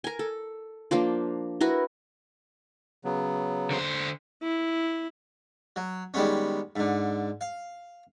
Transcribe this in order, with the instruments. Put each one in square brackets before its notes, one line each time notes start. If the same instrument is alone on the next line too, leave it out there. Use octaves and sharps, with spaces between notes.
[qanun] A#4 G#5
A4
F3 A#3 D4 F4
E4 F#4 A#4 B4
[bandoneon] C#3 F#3 B3
[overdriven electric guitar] D3 C5
[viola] E4
[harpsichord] F#3
D#3 G3 G#3 B3 C#4
G#2 D3
F5